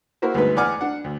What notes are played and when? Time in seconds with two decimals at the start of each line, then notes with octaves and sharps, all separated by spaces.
0.22 A#3 E4 F#4 A#4 C5
0.34 D2 G2 G#3 B3 D#4 B4
0.56 E2 D5 F#5 G#5 D6 F6
0.81 D4 F#5
1.04 D2